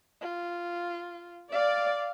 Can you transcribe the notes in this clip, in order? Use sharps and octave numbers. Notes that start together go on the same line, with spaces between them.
F4
D5 F5